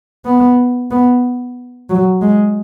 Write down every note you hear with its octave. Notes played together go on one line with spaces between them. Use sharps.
B3
B3
F#3
G#3